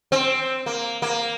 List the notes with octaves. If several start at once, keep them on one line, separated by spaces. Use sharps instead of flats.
C4
A#3
A#3